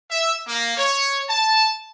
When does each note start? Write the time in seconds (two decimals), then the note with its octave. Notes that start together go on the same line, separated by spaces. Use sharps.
0.11 E5
0.48 A#3
0.78 C#5
1.29 A5